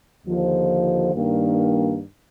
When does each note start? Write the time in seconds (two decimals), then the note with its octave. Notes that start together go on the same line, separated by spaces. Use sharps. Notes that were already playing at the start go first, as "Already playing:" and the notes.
0.25 D#2 D3 F3
1.13 G2 D#3 A#3 D4